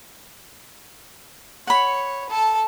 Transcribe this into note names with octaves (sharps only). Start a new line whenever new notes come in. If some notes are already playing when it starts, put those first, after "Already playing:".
C#5 F#5 B5
A4 A5